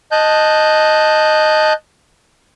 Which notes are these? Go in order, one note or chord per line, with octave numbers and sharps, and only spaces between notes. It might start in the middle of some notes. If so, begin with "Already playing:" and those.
D#5 A5 F#6 G6